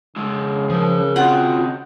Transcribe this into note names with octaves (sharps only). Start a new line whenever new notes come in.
C#3 G#3 E4
F3 G#4 A#4
C4 F4 F#4 D#5 F#5 G5